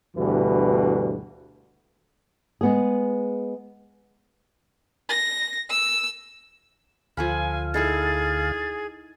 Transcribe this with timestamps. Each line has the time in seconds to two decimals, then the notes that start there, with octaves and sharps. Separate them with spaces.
0.16 D2 G2 B2 E3
2.61 G#3 B3 G#4
5.09 A#6
5.70 E6
7.17 D2 F3 A4 F5 G#5 B5
7.74 D#4 E4 G#4 A4 A6